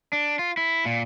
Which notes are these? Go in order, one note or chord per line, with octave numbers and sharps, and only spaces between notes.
D4
F4
E4
A#2